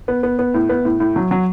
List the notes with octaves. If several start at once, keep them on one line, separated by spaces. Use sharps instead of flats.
B3
B3
B3
A2
B3
A2
A2
F#3
F#3